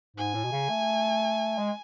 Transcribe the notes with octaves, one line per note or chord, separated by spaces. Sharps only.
G#2 G#5
A2
B2
C#3
A3
G#3